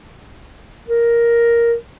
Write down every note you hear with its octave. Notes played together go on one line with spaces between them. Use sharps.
A#4